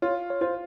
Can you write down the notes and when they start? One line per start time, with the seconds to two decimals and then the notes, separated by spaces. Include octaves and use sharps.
0.02 F4 C#5
0.30 C#5
0.41 F4 C5